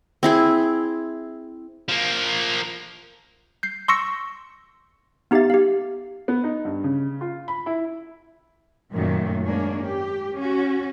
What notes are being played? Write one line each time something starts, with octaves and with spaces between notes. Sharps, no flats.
C4 E4 G#4
F3 A#3
G6 C7
C6 C#6 E6 A#6 C#7
B3 D#4 G4 E5 F5 A6
G4 F5
B3
D#4
G2
C#3
F4
B5
E4
F#2 A#2 D#3 F#3 A3
G#2 A#3 C#4 D4
G4
C#4 F#4